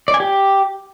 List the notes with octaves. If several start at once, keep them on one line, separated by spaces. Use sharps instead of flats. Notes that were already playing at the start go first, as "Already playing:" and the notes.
D5
G#5
G4